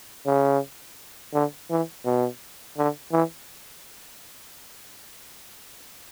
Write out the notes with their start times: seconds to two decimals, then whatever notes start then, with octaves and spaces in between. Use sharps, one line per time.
0.27 C#3
1.34 D3
1.71 E3
2.05 B2
2.78 D3
3.12 E3